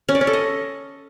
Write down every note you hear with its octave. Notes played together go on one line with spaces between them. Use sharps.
C#4
D5
C#4
A4
D#5